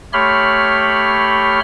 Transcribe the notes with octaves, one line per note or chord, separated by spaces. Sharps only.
A3 G4 C#5 B5 C6 F6